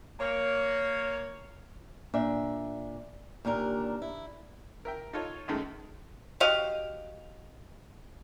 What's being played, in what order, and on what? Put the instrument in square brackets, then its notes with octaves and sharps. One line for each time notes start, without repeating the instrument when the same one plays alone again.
[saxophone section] A#3 C#5
[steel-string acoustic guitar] A#2 D4 E5
D#2 A#2 D4 A#4
E4
[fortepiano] A#4 E5 G5
D#4 F4 A4 C#5
C#2 F#2 D#3 G#3 A3
[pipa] F#4 G4 D#5 F5